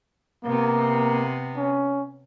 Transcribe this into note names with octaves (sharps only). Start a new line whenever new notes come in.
C3 A#3 B3
C#4